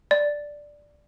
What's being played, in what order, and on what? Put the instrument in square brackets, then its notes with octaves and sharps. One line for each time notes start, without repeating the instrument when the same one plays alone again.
[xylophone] D5